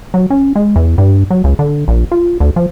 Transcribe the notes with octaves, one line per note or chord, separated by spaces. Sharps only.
F#3
C#4
G#3
E2
G2
F#3
C#2
D3
A#1
F4
D2
F3